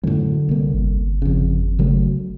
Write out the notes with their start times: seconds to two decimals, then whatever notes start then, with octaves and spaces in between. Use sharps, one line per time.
0.04 F#2 A2 D3
0.49 C2 A#3
0.74 G1
1.22 F2 C#3
1.79 C#3 F#3 A3